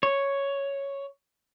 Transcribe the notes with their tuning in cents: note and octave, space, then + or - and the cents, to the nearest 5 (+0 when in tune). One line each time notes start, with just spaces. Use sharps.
C#5 +0